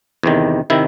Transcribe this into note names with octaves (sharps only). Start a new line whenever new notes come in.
E2 C3 D#3
C3 D#3 E4